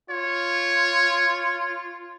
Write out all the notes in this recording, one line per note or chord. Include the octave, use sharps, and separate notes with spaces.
F4 C#5